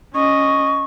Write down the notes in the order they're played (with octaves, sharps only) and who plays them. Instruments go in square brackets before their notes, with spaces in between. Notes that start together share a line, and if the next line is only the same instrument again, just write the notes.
[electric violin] C#4 D#5 [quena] C#6